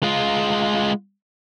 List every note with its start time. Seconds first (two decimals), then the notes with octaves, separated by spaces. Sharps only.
0.03 G#3 F4